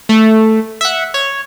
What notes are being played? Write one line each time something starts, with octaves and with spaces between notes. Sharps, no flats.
A3
E5 F#5
C#5